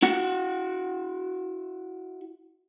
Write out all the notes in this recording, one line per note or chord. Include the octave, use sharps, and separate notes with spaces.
E4 F#4 F#5